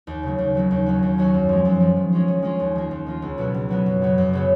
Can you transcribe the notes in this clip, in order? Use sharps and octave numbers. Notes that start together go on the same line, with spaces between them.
D#2
C#3 F#3 A#3
D#2
C#3 F#3 A#3
D#2
D#3 F#3 C#4 F#4
D#2
D#3 F#3 C#4 F#4
F#2
F3 G#3
F#2
F3 G#3
D#3
G#3 C#4 F4
D#3
G#3 C#4 F4
D#2
D#3 A#3 F4
D#2
D#3 A#3 F4
C#2
B2 F#3 B3 F#4
C#2
B2 F#3 B3 F#4
F#2
C#3 F#3 B3
F#2
C#3 F#3 B3